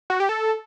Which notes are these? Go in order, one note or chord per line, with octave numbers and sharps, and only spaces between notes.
F#4
G4
A4